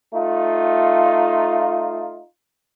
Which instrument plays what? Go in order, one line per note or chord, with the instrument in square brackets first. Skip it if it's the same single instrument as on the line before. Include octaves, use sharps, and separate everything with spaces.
[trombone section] A3 D#4 F4